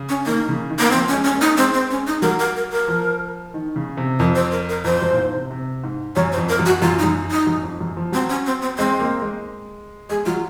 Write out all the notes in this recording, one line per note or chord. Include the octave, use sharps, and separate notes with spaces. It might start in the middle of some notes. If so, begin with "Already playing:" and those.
Already playing: C#3
C#4
D#3 A#3
C#3
D#3
A#3
F3 C4
C#4
G#3
C#4
G#3
A#3
D#4
G#3 C4
C4
C#4
D#4
F#3 A#4
A#4
A#4
A#4
F3
D#3
C#3
C3
F2 A#4
C5
A#4
A#4
F2 C5
F#2
A#2
G#2
C3
C3
G#2
F#2 C#5
C5
F2
A#4
F#2
F#4
F#2 F4
D#4
F#2
D#4
F#2
F2
F#2
F3
F#3 C4
C#4
C4
C4
G#3 C4
A#3
G#3
G#3 G#4
F#3 F4